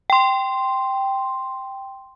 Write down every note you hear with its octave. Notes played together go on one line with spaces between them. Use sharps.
G5 C6